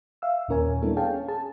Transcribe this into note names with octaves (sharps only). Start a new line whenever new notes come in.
E5 F5 E6
D#2 A#2 C#4 A#4 C#5 G#5
G3 A#3 B3 D4 E4 A4
G#4 C#5 F5 G5 A5
C#4
G#4 A5